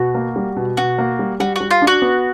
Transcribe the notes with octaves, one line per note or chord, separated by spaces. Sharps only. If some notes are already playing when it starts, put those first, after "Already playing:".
Already playing: B2 F#4
A#3
G3
B2
B2 F#4
A#3
G3
G3 F#4
G3 F#4
F4
D4
F#4
B3